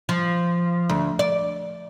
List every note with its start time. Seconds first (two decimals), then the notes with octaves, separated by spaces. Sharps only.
0.09 F3
0.89 D2
1.19 D5